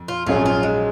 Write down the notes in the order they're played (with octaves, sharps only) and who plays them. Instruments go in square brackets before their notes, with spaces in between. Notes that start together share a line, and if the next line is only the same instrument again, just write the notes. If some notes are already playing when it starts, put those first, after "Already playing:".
Already playing: [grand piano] F2
[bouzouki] F4
[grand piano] A#1 G#2 F#3 C#4 G#4 [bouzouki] F4
[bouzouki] F4
G#3